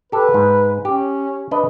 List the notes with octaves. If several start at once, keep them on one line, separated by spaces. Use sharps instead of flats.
G4 A4 B4
G#2
C#4 G4
D4 B4 D#5